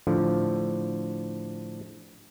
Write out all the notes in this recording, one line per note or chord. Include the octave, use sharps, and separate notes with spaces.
A2 D3 F3